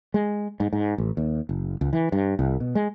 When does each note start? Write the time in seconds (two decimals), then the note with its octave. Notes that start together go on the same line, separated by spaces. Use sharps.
0.14 G#3
0.60 G#2
0.73 G#2
0.98 A1
1.17 D#2
1.49 F#1
1.81 C#2
1.93 E3
2.12 G2
2.39 C2
2.60 B2
2.75 G#3